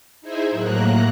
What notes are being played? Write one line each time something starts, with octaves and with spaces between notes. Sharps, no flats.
D#4 E4 G#4 C5 E5 G#5
A2 F#3 A#3 A#5 F#6